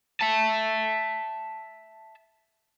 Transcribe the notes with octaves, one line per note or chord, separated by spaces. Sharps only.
E5 A5